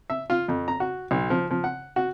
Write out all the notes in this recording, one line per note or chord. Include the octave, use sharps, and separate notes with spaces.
E5
F4
F2
A#5
F#4
B1
F3
F3
F#5
F#4